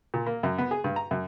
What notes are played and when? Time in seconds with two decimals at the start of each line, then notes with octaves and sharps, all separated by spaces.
0.14 A#2
0.26 A#3
0.43 F#2
0.58 B3
0.71 G#4
0.84 G2
0.96 A#5
1.11 F#2